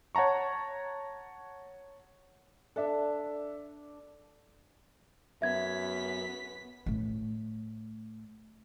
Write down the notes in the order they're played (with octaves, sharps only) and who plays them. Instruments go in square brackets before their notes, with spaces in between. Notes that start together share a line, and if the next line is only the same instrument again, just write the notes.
[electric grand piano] C#5 F#5 A5 A#5 C#6
[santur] D4 [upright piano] A4 E5
[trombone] F#2 [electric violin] B3 B6 [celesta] E5 G#6
[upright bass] A2 A3